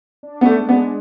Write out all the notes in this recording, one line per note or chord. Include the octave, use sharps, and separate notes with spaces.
D4
B3
A3
G#3
B3